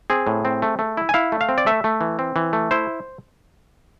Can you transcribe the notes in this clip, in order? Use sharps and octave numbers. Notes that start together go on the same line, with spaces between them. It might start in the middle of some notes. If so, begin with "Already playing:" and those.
C4 G#4
A2
C4
A3
A3
E4
G#5
E4 F5
A3
F5
C4
D5
A3 E5
A3
E3
C4
E3
A3
E4 C5